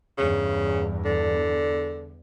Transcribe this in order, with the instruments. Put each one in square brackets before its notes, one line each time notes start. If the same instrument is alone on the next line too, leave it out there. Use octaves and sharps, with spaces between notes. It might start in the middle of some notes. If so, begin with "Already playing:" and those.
[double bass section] E2 G2 [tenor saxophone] C#3
[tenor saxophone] D3